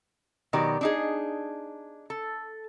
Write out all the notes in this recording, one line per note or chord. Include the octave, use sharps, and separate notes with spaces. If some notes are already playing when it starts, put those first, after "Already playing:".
B2 D#3 F#3 G4 D5
D4 D#4 G#4
A4